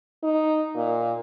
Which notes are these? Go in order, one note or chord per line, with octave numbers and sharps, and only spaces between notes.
D#4
A#2